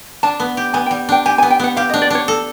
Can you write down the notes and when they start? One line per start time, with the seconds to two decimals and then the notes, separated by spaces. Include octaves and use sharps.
0.23 D4 A5
0.40 B3
0.57 G4
0.73 B3 G#5
0.86 G5
0.91 G3
1.09 D4 G5
1.26 G4 G#5
1.38 G#5
1.42 B3
1.50 G5
1.60 B3 F#5
1.77 G4 F5
1.89 D#5
1.94 D4
2.02 D5
2.10 D4 C#5
2.28 A4